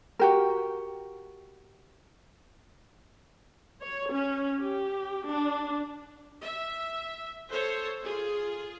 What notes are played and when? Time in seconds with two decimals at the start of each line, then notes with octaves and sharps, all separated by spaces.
0.19 F#4 G4 A#4
3.81 C#5
4.13 C#4
4.61 G4
5.29 D4
6.41 E5
7.51 A4 C5 C#5
8.03 F4 G#4